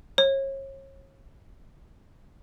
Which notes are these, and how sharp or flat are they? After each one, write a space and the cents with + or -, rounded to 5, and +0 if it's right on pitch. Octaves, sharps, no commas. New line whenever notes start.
C#5 -35